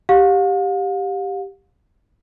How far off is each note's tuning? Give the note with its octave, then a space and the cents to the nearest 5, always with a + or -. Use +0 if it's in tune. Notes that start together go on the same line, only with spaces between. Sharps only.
G4 +0 F5 +45